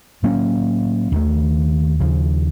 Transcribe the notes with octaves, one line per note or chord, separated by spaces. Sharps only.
A2 F#3 A#3 C#4
D#2 D#3 A3
D#2 C#3 F3